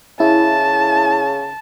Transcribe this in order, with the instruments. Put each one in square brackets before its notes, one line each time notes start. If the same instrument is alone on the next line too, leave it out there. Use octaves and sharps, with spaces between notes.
[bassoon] C#3 [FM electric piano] E4 [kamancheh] A5